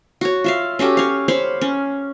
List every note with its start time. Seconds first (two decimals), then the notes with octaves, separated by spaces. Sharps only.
0.21 F#4 C#5
0.44 F4 E5 F5
0.79 C#4 F#4 G4 A4
0.97 C#5 F5
1.28 C5 C#5 F5 B5
1.61 C#4